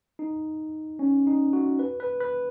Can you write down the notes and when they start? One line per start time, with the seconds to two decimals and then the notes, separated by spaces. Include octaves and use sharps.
0.19 D#4
0.99 C#4
1.27 D#4
1.53 F#4
1.79 B4
2.00 B4
2.20 B4